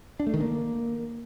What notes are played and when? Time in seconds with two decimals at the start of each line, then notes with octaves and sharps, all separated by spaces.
0.20 D4
0.27 A3
0.34 D#3
0.41 A#3